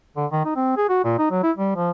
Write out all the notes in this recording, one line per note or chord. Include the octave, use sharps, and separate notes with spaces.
D3
D#3
D#4
C4
G#4
F#4
A#2
D#4
F#3
E4
G3
F3